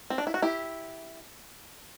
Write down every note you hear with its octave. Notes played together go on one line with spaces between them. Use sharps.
C4
D4
E4
F#4
E4 G4